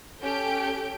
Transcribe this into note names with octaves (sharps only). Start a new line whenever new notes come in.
C#4 G4 A4 G6 D7